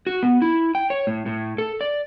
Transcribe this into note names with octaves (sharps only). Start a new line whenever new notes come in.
F#4
B3
E4
G5
C#5
A2
A2
A4
D5